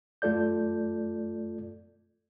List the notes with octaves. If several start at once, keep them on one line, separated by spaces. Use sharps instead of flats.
F#2 A3 F4 A4 D5 G6